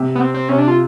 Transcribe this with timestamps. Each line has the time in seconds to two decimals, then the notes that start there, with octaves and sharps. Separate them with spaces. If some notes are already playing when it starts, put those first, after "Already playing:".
Already playing: C3
0.15 B3
0.21 C4
0.34 C4
0.49 C3 C#4
0.58 D4
0.68 F4